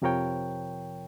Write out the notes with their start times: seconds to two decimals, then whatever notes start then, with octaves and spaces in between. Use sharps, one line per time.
0.02 F2 C3 F3 A#4 C#5 G5